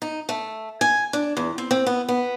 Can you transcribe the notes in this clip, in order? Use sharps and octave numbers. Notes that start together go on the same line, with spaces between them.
D#4
A3
G#5
D4
E2
C4
C4
B3
B3